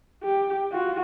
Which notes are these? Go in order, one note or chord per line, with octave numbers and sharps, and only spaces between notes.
G4
F4 F#4